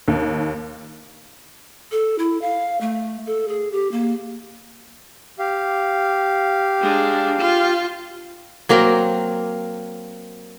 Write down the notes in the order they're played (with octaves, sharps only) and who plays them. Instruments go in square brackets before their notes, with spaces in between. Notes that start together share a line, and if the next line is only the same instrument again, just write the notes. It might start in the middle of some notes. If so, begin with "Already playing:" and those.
[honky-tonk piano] D#2
[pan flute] A4
E4
F5
A3
A4
G#4
G4
A#3
[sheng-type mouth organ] G4 F5
[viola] G#3 D4
F4
[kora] F#3 A#3 C4 A#4